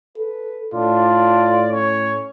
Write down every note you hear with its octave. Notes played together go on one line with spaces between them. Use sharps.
A4 B4
A2 D4 F4 D5
C#4 C#5